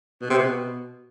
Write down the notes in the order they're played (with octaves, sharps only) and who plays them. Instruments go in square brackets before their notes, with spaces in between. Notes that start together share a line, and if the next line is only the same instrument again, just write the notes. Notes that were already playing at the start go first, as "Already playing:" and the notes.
[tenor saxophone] B2
C3
B2